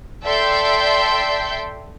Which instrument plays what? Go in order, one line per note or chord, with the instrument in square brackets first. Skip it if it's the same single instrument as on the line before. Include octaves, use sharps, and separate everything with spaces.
[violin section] A4 D5 E5 G5 C6 G6